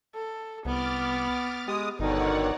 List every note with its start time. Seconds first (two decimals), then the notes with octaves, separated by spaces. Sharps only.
0.15 A4
0.65 C2 B3 D6 F6 A6
1.68 G#3 G4 D#6
1.99 G1 B2 D3 D#3 D#4 C#5 D5 F#5